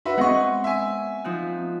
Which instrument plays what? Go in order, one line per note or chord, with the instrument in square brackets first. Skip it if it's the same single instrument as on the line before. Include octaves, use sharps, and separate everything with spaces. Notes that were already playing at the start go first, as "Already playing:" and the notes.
[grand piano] F#4 B4 E5 [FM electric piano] C6
[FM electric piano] G#3 B3 C4 [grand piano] D#5 C#6 [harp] F#5 C6
[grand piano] E5 G#5
[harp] F3 D#4 F#6